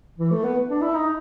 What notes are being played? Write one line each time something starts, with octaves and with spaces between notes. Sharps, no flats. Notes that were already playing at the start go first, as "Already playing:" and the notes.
E3
A3
B3
D4
E4
D#4